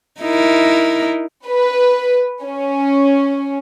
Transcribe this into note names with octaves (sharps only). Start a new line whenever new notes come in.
D#4 E4 A#4
B4
C#4